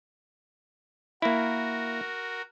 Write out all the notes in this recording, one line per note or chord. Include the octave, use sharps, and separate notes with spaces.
A#3 E4 F#4 A#4